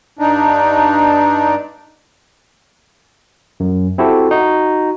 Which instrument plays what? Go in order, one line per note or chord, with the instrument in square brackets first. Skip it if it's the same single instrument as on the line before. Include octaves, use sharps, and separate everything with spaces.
[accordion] G2 D4 D#4
[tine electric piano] F#2
C4 E4 F#4 G4 A4
D#4 F#4